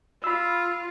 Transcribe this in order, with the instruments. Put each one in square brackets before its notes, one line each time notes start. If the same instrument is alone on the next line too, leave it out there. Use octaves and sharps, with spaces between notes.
[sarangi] F4 [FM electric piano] B5 E6